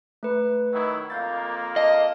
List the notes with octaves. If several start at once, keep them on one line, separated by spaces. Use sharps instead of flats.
A3 B4
D#3 F#3 E4
F2 A#3 F5 G6 A6
D#5 F5 A5